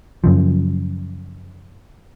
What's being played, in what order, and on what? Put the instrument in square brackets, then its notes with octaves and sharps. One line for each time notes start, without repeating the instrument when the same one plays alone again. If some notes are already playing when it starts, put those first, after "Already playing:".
[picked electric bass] F#2 C#3 F3